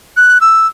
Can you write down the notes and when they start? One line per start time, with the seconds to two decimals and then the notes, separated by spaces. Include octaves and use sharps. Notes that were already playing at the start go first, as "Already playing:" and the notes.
0.17 F#6
0.41 E6